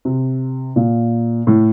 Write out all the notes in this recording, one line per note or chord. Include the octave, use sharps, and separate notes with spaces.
C3
A#2
A2